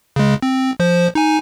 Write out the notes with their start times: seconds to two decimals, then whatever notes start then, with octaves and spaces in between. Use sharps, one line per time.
0.16 C#3 G#3
0.42 C4
0.80 F3 C5
1.15 D#4 G#5